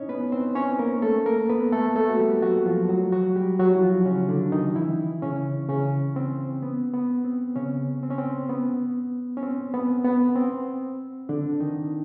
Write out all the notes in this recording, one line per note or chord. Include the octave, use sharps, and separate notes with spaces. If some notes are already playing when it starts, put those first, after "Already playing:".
Already playing: C#4 D#4 E4 C#5 D#5
B3 B4
C4 C5
C#4 C#5
A#3 A#4
A3 A4
A#3 A#4
B3 B4
A3 A4
A3 A4
F#4
G3 G4
F#3 F#4
F3 F4
F#3 F#4
F#3 F#4
G3 G4
F#3 F#4
E4
F3 F4
C#3 C#4
D3 D4
D#3 D#4
E3 E4
C#3 C#4
C#3 C#4
C4
B3
B3
C4
C#3 C#4
C4
C#4
C4
B3
C#4
C4
B3
B3
C4
D3 D4
D#3 D#4